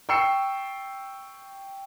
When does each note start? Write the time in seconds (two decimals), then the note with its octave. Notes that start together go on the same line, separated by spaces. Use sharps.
0.09 G5 C#6 E6 C7 C#7 E7